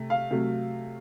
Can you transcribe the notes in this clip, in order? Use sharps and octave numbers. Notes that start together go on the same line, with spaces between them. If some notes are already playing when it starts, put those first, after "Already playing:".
Already playing: C3 A3
F5
C3 F#3 A3